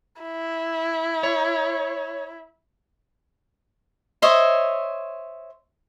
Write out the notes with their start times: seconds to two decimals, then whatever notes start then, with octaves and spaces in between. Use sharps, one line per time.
0.22 E4
1.23 C#5
4.22 C5 C#5 D#5 E5